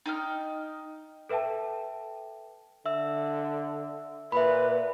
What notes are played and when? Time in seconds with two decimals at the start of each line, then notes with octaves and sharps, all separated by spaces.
0.06 D#4 G5 F6
1.29 A4 B4 E5 G5 A5
2.86 D3 E5 E6
4.32 A#2 B4 E5 B5